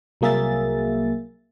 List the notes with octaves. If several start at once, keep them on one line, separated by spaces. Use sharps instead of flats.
C2 F#3 A#3 G#4 E5 A6